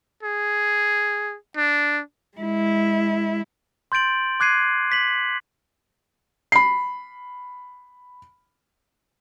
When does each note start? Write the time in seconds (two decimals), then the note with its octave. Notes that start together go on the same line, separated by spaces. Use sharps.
0.23 G#4
1.56 D4
2.38 G#3 E4
3.92 C6 G6 A6 D7 F#7
4.40 D6 F#6 G#6 C7 D#7
4.92 B6 F#7
6.52 B5 C7